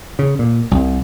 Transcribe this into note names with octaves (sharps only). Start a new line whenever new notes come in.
C#3
A#2
C2